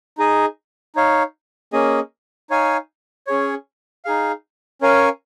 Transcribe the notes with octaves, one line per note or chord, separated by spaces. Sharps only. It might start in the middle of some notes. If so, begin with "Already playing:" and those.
D#4 G#4 D#5
D#4 C#5 F5
A#3 C#4 G#4 D#5
D#4 C#5 F5 G#5
C#4 G#4 C#5
D#4 G#4 F5
C#4 A#4 C#5 F5 G#5